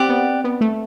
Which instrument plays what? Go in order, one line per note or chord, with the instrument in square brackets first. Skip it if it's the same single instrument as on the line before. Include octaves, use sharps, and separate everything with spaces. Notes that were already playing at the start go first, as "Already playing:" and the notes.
Already playing: [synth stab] C4 [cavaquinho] G4 D5 F#5
[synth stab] B3
B3
A3